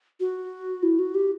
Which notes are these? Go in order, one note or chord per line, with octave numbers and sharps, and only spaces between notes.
F#4
E4
F#4
G4